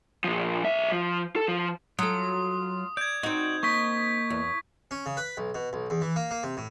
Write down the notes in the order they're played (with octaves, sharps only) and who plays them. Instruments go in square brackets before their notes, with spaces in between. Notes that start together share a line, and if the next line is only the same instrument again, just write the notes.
[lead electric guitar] A#2 F3
B1 E5
F3
A4
F3
[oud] F#3 A4 [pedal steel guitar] F4 [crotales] D#6
[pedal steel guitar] D5 [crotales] G6 G#6
[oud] C4 D#4 [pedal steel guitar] F#4 D5
[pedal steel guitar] A#3 D#5 G5 [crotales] C#6 B6
[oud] E2
[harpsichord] C#4
C#3
B4
B1
B2
B1
E2
E3
A#3
A#3
C3
A2